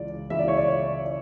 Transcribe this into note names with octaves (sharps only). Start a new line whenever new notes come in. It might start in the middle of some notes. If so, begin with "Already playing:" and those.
Already playing: C#2 C#3 E3 D5
C#2 C#3 E3 E5
D5
C#5
D5
C#5
D5